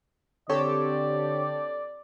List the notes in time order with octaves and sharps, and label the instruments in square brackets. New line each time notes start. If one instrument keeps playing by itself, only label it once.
[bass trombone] D3 [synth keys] C4 G4 A4 [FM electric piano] C#5 [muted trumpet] D5